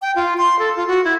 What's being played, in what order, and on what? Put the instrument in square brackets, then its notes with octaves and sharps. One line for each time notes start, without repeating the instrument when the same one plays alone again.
[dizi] G5
F4
C6
A4
F4
F#4
E4